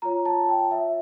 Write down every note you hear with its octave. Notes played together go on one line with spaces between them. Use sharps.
F4 C#5 A#5
A5
G5
E5